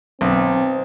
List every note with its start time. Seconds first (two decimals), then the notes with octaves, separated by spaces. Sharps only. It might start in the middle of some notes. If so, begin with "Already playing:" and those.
0.21 B1 C4